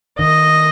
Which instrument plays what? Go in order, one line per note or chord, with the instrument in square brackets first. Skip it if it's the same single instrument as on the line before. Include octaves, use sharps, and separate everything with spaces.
[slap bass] D#3 [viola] D#5